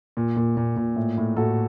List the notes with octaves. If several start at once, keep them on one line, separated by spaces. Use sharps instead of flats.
A#2
A#2
A#2
A#2
A2
A2
A2 F#4 A4